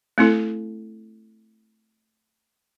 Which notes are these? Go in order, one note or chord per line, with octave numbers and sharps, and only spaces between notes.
A3 C4 E4 A4